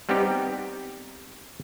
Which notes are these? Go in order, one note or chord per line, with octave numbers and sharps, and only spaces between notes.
G3 B3 C4 D#4 G4